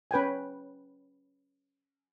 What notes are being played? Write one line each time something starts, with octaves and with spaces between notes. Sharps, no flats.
C#4 B4 G5 G#5